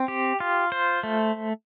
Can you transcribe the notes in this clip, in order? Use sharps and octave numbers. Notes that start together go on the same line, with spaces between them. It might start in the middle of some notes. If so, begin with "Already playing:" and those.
Already playing: C4
G4
F4
C5
A3